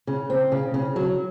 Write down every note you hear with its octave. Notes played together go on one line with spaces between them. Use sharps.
C#3
C4
C#3
C#3
F#3